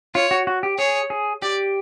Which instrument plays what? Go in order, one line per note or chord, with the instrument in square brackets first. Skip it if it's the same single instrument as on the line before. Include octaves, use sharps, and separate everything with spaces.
[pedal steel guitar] F4 [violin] C#5
[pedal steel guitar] F#4
F#4
G4
[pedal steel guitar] G#4 [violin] C#5
[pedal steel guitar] G#4
[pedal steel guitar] G4 [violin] D5